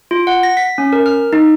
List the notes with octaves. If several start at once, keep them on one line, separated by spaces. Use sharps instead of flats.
F4
F#5
A#6
B6
C#4
A#4
F6
D#4